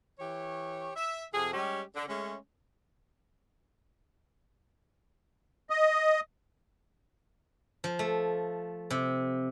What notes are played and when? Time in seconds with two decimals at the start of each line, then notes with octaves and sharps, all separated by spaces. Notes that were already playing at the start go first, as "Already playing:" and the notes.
0.20 E3 G4 C#5
0.96 E5
1.33 F2 C3 G#4
1.53 G3 G#3 C#4 G4
1.95 D3
2.09 G#3 A3 C#4
5.70 D#5
7.84 F3
7.99 A3
8.90 C3